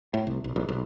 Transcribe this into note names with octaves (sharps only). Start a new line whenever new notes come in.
A2
C2
B1
A#1
B1